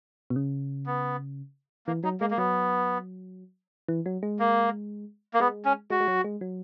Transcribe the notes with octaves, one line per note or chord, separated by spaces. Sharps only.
B2
C#3
B3
E3 A#3
F#3 D#4
G#3 A#3
A#3
F#3 B3
E3
F#3
G#3
A#3
A#3
G#3 B3
C#4
G#3 F#4
G#3
F#3
G#3
F#3